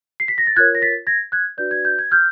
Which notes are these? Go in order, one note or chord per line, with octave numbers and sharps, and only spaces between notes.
C7
B6
A#6
A6
F4 A#4 C#5 F#6 G#6
A#6
A6 B6
G#6 A#6
F#6 G#6
D4 F#4 B4 D5 G6
G#6
G6
G#6
F6 G6